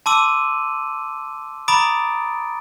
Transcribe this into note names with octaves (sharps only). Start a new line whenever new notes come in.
A5 C6 D6 E6 D#7 F#7
A#5 B5 D6 D#6 A6 D7